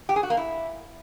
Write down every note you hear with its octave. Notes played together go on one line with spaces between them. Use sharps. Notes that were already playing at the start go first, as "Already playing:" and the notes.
G4
G#4
F#4
A#3
E4